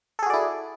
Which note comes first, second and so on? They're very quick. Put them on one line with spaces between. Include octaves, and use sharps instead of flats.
A4 G#4 F#4 D5 E4